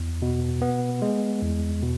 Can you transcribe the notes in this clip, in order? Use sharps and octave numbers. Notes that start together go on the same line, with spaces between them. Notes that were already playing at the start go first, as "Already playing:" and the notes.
Already playing: E2
B2
B3
G#3
E2
B2